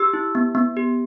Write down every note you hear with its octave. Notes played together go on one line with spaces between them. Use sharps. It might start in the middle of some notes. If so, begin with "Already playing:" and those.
Already playing: G4 E6
E4
B3
B3
G4